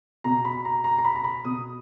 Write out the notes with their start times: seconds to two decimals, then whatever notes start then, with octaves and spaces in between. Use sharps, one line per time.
0.24 B2 A#5
0.45 B5
0.65 A#5
0.84 A#5
0.98 A#5
1.05 B5
1.16 A#5
1.24 B5
1.45 B2 D#6